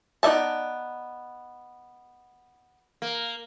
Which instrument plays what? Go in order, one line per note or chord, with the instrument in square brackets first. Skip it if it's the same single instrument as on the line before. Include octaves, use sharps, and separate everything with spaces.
[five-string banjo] B3 D#4 D5 E5 A5
[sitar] A#3